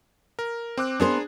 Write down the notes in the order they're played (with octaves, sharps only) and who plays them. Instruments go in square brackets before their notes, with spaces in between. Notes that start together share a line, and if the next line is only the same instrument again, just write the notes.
[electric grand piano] A#4
C4 D6 F#6
[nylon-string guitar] B3 A#4 C5 [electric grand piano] D4 G#4